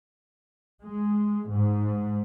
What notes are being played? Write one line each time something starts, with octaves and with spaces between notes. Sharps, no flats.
G#3
G#2